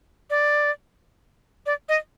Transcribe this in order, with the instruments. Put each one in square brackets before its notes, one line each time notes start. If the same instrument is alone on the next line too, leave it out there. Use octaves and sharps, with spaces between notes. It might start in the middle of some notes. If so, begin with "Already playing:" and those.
[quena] D5
D5
D#5